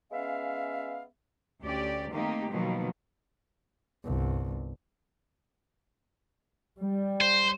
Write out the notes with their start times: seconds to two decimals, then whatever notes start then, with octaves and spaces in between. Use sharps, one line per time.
0.12 G#3 B3 C#4 E5 F5
1.61 D2 C#4 G4 D5
2.11 D#3 A3 A#3 C4 D#4 G4
2.51 B2 D#3 F3 F#3 A#3
4.04 G1 C2
6.79 G3
7.21 C5